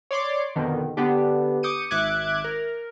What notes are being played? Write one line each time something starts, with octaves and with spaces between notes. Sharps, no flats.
C#5 D5 C6 D6
F2 B2 D3 D#3
D3 B3 D4 G4
D6 D#6 G6 C#7 D#7
G#1 E5 D6 F#6 G#6
A#4